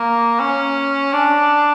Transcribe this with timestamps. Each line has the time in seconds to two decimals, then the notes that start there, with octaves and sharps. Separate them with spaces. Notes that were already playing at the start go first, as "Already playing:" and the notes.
Already playing: A#3
0.40 C#4
1.13 D4